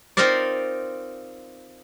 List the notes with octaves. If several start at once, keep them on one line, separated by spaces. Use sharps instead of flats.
C4 D#4 F4 A#4 C5 D5